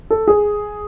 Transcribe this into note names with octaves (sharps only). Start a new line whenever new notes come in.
A4
G#4